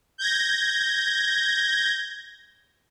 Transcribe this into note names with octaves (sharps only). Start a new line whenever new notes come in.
G6 G#6 A#6